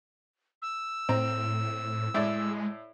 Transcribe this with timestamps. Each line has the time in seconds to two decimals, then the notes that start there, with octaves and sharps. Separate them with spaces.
0.62 E6
1.09 A2 C4 A#5
2.14 A2 G#3 E4 D5